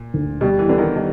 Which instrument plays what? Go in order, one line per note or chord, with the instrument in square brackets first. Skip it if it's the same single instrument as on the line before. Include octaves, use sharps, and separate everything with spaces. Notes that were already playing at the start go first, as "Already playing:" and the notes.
Already playing: [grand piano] A#2
[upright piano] D2
[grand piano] B2 [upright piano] G3
[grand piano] E3
[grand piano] D3 [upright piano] B3
[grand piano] D#3
[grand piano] D#3 [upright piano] G3